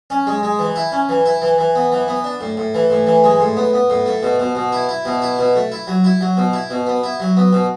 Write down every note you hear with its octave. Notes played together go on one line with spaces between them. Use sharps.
C#4
G#3
G#3
E3
E4
C#4
E3
E4
E3
E3
B3
E3
B3
D4
A2
A2
E3
A2
E3
G#3
A2
B3
B3
A2
A3
B2
B2
B2
E4
E4
B2
E4
B2
A3
E4
F#3
E4
F#3
B2
E4
B2
B3
E4
F#3
B3
B2